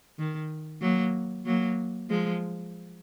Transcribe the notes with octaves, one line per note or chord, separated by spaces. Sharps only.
D#3
F#3 A#3
F#3 A#3
F3 G#3